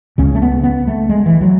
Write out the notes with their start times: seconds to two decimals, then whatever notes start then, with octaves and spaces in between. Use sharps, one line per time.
0.18 C#2 C#3 C#4
0.35 A3
0.42 B3
0.64 B3
0.88 A3
1.09 G#3
1.26 E3
1.41 F#3